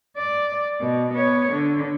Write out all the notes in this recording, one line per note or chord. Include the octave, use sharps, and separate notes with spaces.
D5
B2
B3 C#5
D3